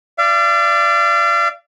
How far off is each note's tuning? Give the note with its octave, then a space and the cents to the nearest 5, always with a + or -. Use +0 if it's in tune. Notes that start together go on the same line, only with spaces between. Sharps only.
D5 +0 F5 -40